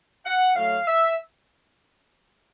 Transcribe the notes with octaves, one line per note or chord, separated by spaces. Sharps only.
F#5
A2 F#3 A3 F5
E5